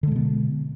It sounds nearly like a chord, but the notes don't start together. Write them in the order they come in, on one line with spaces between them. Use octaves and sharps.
D3 G#3 B2 B3